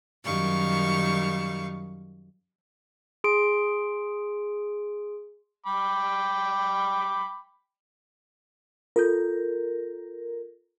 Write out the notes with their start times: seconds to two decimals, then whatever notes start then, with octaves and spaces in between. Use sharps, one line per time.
0.24 F#2 D#3 G3 F5 C#6
3.24 G#4 C6 D7
5.66 G5 B5 D6
8.96 F4 A4 A#4 G6